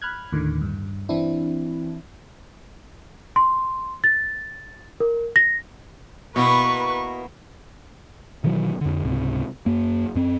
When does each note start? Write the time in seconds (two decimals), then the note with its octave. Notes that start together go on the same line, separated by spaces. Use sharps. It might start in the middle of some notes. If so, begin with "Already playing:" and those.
0.02 B5 F6 F#6 G#6
0.32 D#2 A2 D3 D#3
0.61 G2
1.09 E3 C4 D4 E4
3.36 C6
4.04 A6
5.00 A#4
5.36 A#6
6.36 B2 A#3 B3 E4 B4 C#6
8.44 B2 D#3 E3 F#3
8.81 F2 D3
9.04 C#2 G#2 C3
9.66 F#2 A#3
10.15 F#2 C4